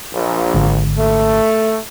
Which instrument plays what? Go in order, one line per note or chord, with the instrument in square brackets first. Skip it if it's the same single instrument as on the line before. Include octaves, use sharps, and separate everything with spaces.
[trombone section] A#1
[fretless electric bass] G#1 D3
[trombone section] A3